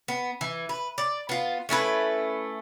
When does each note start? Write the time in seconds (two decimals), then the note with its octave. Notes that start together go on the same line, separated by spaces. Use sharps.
0.08 B3
0.41 E3
0.69 B4
0.98 D5
1.29 B3 F4
1.69 A3 C#4 E4 B4